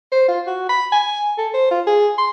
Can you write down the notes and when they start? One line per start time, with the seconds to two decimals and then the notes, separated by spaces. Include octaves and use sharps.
0.12 C5
0.28 F4
0.47 F#4
0.69 B5
0.92 G#5
1.38 A4
1.54 C5
1.71 F4
1.87 G#4
2.18 C6